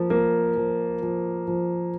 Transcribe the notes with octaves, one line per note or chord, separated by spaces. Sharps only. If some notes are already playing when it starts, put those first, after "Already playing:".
Already playing: F3 A#3
A#3
F3
F3
F3